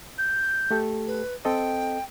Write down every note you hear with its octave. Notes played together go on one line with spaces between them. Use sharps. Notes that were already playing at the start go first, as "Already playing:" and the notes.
G6
A3 G4 A4
B4
C4 A4 D#5 G5